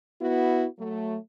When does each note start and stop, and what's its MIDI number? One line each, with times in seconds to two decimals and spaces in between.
0.22 0.67 59
0.22 0.67 64
0.22 0.67 66
0.79 1.17 54
0.79 1.17 57